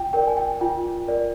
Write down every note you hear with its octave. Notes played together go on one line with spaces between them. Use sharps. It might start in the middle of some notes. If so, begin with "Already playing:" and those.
Already playing: F4 G5
A#4 D5 G5
G#5
G5
F4 G5
A#4 D5